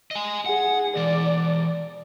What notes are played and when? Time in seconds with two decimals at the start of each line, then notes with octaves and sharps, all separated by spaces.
0.11 D#5 G#5
0.46 G#4 F#5
0.97 E3 G#3 D5